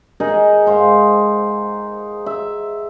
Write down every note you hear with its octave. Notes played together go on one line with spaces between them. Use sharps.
D#4 G#4 A#4
G#2 C5 F5 F#5
E5